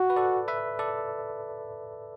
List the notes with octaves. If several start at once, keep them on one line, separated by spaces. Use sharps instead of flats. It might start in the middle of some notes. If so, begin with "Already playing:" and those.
Already playing: F#4
B4
A4 D5
B4 E5
A4 D5